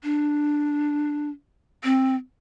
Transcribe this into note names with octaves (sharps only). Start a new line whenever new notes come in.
D4
C4